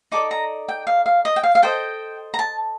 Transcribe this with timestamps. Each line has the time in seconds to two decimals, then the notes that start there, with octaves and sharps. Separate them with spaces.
0.12 D#4 A4 D5 D6
0.31 A#5
0.69 G5
0.87 F5
1.06 F5
1.25 D#5
1.36 G5
1.43 F5
1.55 F5
1.62 A4 C5 D#5 G5
2.34 A#5
2.39 A5